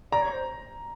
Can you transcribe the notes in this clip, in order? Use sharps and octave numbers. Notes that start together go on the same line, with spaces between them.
D5 A#5
C#5
C5